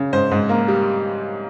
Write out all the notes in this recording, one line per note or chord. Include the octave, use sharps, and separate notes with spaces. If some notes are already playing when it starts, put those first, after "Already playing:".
Already playing: C#3
G#2 C5
G#2
A#3
G3